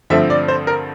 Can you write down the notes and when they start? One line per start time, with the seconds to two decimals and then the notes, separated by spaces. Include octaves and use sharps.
0.10 G2 D3 F3 A3 C4 E5
0.30 D5
0.48 C5
0.67 A#4